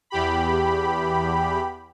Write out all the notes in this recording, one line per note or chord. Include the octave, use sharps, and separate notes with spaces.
E2 G4 B5